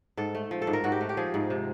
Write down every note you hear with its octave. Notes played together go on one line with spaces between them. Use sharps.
G#2 A4
A3
F3
A4
G#2
A#4
G#2 F#4
G4
A3
G4
F3 G#4
G#2
C3